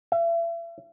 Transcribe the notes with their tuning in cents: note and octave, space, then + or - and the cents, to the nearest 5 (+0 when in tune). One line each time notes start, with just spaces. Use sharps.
E5 +40